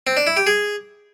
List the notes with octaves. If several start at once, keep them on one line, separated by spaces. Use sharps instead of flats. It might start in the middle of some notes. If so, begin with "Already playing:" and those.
C4
D4
E4
G4
G#4